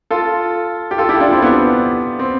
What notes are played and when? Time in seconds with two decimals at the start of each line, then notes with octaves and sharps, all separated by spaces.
0.11 F4 A4
0.91 G4
0.98 F4 A4
1.09 E4 G4
1.21 D4 F4
1.32 C4 E4
1.42 B3 D4
2.19 C4